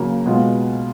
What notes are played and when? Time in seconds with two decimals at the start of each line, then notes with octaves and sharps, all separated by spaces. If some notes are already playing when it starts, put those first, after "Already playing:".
Already playing: C#3 F#3 A#3
0.25 B2 G#3 B3 F4